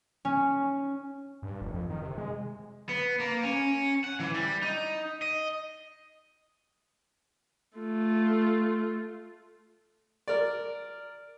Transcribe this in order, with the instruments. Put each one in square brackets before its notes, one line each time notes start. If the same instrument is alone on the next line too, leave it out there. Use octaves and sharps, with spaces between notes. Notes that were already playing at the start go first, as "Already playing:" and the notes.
[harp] C#4
[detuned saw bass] G2
F1
F2
D#3
C3
G#3
[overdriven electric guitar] B3
A#3
C#4
F#5
E3
G3
D#4
D#5
[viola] A3 F4
[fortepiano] A#4 D5